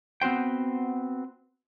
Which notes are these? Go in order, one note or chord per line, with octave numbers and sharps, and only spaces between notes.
B3 C4 F#4 C5 G5